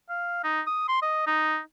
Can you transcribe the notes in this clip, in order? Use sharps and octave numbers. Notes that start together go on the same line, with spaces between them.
F5
D#4
D#6
C6
D#5
D#4